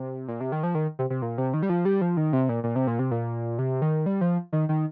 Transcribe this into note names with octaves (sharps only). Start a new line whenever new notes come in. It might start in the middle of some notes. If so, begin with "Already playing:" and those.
Already playing: C3
A#2
C3
D#3
F3
D#3
C3
C3
A#2
C3
D#3
G3
F3
G3
F3
D#3
C3
A#2
A#2
C3
A#2
C3
A#2
C3
D#3
G3
F3
D#3
D#3